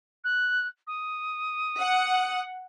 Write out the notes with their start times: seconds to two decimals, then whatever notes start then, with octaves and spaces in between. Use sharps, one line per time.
0.24 F#6
0.87 D#6
1.79 F#5